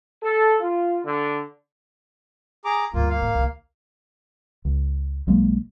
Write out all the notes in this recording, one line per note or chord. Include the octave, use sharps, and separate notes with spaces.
A4
F4
D3
G#4 A#5 D6
D2 G2 A#3 F4
A#3 F5
A2
C2 D#3
C#2
B1 F#3 G#3 A#3